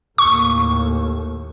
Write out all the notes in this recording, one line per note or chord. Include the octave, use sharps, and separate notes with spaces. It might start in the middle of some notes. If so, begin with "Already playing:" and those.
D#2 A2 C#6